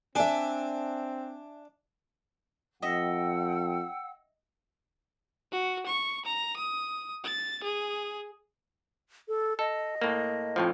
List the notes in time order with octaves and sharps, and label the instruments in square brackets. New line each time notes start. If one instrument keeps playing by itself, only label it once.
[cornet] C4 [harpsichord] D4 [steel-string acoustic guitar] E5 G#5
[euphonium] F2 [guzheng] D#5 E5 [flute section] F#5 G5 E6
[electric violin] F#4
C#6
A#5
D#6
A6
G#4
[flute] A4
[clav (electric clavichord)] A4 [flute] D#5
[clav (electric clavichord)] A2 A#3
F2 A2 F3